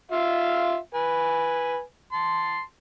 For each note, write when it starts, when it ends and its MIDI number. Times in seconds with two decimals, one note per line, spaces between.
0.11 0.76 65
0.11 0.76 76
0.11 0.76 77
0.95 1.81 71
0.95 1.81 80
2.12 2.61 81
2.12 2.61 84